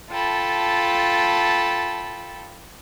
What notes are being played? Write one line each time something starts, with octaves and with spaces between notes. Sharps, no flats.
F4 A4 G5 A5 B5